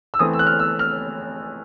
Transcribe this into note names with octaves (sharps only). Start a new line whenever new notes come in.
E6
E3 A3 C4 D#6
E6
F#6
F6
E6
F6